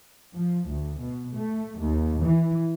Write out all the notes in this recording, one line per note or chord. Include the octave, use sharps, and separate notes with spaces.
F3
D2
B2
A3
D#2
E3